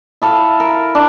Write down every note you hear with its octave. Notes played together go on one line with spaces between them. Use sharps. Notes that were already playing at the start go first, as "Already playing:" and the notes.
E4 A4 F5
A#4
D4